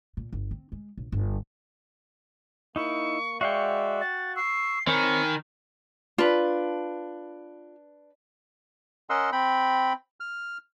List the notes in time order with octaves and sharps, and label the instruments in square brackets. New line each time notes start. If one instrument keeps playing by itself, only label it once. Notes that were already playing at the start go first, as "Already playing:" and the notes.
[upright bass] A#2
G1
C4
G#3
A#1
G1
[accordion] A#3 [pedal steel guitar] D#4 E4 [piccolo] C#6
[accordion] G#3 D5 E5 [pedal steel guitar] F#4 F5 G5 [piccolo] C#6
[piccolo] A6
[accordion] C#6 E6 [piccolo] C7
[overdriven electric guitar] D#3 [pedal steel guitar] C4 C#5 [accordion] G#5 [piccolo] B5
[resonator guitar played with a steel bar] D4 B4 [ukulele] F4
[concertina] C#4 A#4 D#5 F#5 C6 E6
C4 G5 B5
F6